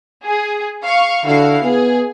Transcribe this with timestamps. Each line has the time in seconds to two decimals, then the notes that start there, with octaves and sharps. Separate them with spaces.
0.24 G#4
0.85 F5 C#6
1.26 D3 E4 F#4 F5
1.64 B3 G#4